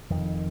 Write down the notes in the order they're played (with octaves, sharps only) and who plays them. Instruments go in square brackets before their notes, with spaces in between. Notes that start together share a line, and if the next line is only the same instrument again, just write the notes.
[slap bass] F1 F2 D#3